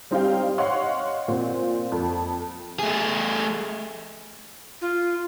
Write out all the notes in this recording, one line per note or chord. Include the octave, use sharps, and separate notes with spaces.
G3 C4 D#4 G4 F5 G5
C#5 D#5 F5 F#5 C6 C#6
A#2 C4
F2
A3 G#4
F4